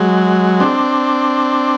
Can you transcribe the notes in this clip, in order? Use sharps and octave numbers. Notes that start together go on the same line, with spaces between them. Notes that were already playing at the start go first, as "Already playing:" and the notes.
Already playing: F#3 G#3
C4 D4